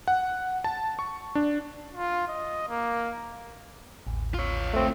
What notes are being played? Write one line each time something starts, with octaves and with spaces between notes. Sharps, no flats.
F#5
A5
C#6
D4
F4
D#5
A#3
A1 D#2
F4 C#5
A3 C4